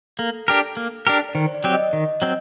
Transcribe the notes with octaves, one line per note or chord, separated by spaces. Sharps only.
A#3 A4
D4 G4 A#4
A#3
D4 G4 A#4
D5
D#3 C5
C5
D5
F#3 C4 G4
D#5
D#3
F#3 C4